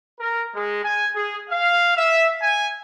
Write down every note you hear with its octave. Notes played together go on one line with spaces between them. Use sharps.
A#4
G#3
G#5
G#4
F5
E5
G#5